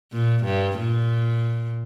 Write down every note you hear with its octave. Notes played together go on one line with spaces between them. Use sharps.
A#2
G2
A#2